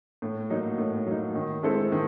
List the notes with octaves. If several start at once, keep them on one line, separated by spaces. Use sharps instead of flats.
A2
F#3 A#3 D#4
A2
F#3 A#3 D#4
D#3
G#3 C4 E4 A4
D#3